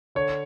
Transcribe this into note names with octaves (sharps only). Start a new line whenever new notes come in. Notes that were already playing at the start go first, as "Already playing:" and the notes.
D3 C#5